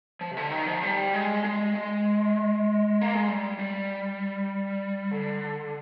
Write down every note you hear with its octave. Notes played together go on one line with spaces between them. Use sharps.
F3
C3
D3
D#3
F3
G3
G#3
G#3
G#3
A#3
G#3
G3
G3
D3